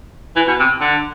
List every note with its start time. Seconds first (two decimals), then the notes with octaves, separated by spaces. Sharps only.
0.36 E3
0.47 B2
0.60 C3
0.81 D3